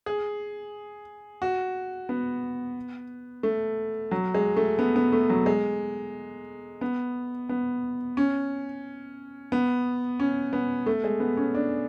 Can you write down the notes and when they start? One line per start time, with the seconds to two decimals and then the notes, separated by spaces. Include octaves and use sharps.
0.06 G#4
1.42 F#4
2.09 B3
3.43 A3
4.11 F#3
4.34 G#3
4.56 A3
4.79 B3
4.96 B3
5.12 A3
5.30 F#3
5.46 G#3
6.81 B3
7.49 B3
8.17 C#4
9.52 B3
10.20 C#4
10.53 B3
10.86 A3
11.04 G#3
11.20 B3
11.37 C#4
11.54 D4